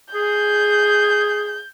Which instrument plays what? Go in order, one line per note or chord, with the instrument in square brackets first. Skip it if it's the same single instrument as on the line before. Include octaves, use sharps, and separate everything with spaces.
[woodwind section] G#4 [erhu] G6